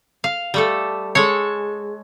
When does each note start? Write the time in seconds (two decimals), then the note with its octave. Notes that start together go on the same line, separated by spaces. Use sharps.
0.24 F5
0.54 G3 A3 A4
1.15 G#3 A4 C#5